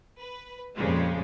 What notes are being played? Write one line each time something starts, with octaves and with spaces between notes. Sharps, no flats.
B4
F2 A#2 C#3 F3 G3 G#3